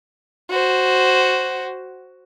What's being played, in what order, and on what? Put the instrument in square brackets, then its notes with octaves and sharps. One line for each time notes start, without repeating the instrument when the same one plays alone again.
[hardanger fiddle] F#4 C5